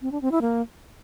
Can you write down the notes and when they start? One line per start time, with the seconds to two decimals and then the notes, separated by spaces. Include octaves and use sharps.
0.02 C4
0.12 D4
0.22 C4
0.32 E4
0.41 A#3